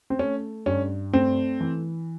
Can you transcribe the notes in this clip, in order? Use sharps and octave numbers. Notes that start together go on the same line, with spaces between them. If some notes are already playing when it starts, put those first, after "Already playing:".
C4
A3 C#4
G2 C#4
A3 C4
E3